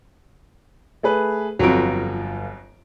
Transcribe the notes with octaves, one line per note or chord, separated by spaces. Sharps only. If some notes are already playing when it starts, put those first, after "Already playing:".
A3 G#4 B4
G1 F2 F#3 F4 D7